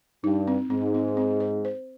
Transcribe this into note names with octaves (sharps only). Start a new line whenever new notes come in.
G2 D#4
C4
G#2 C4
C4
C4
C5
C5